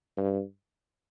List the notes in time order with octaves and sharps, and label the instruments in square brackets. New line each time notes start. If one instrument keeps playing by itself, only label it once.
[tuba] G2